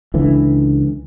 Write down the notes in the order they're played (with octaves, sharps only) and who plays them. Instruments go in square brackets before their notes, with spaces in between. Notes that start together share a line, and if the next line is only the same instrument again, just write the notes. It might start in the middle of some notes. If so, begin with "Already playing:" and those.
[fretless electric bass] C#2 D3 E3